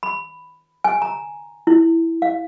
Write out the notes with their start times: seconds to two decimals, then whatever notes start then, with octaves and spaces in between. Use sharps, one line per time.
0.03 B5
0.84 G#5
1.02 A#5
1.67 E4
2.22 F5